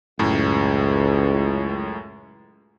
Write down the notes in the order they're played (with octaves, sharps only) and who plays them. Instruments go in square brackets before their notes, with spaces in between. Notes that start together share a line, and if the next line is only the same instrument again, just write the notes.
[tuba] C#2 [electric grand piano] F#2 A2